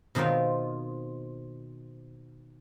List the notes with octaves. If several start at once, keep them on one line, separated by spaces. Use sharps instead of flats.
B2 D#3 C4 D#4 F4